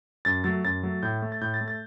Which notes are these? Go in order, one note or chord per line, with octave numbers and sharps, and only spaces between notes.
F#2 A6
F#3 A3 A6
F#2 A6
F#3 A3
A2 G6
A3
A6
A2 G6
A6
A3
A6